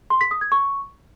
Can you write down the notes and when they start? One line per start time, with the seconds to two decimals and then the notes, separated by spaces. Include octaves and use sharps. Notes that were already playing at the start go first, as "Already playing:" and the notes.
0.10 C6
0.21 B6
0.31 D#6
0.41 G#6
0.52 C#6